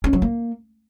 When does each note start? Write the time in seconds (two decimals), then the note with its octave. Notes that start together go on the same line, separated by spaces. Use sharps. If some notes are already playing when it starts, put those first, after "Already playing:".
0.04 C#4
0.13 F#3
0.22 A#3